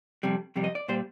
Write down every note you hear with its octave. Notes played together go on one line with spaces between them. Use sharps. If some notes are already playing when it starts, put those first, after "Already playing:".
F2 C3 G3
F2 C3 G3
D#5
D5
A#2 G3 C5